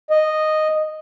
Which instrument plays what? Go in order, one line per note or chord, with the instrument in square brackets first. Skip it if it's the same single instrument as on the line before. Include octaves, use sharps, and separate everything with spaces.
[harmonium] D#5